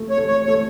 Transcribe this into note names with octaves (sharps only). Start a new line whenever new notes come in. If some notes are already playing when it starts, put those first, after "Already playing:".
Already playing: A3
C#5
A3
C#5
A3 C#5